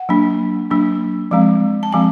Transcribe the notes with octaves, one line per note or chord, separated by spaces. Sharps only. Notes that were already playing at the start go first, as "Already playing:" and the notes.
Already playing: F#5
F#3 A#3 D4
F#3 A#3 D4
F3 G#3 C4
A5
F3 G#3 C4 G#5